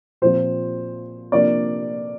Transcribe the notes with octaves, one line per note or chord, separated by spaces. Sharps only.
A#2 F3 C4 C5
C3 F3 A#3 D4 D5